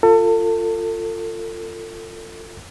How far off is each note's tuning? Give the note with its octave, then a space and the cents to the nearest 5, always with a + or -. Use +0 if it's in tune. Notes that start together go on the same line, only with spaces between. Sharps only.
F4 +0 A4 +35